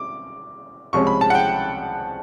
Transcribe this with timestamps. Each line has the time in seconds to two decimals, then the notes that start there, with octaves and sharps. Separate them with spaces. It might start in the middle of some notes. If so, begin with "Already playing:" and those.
Already playing: D6
0.93 C2 C3 F3 G#3 C#4 C#6
1.07 B5
1.21 A5
1.30 F#5
1.35 G5